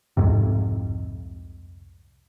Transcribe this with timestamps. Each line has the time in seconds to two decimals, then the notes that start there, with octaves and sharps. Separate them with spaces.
0.17 C2 F2 G#2 C3